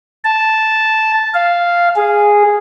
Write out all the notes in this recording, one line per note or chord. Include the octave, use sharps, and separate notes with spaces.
A5
F5
G#4